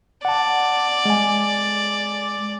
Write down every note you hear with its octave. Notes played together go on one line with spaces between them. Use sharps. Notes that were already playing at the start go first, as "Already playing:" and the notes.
D5 F#5 A5
G#3 G#5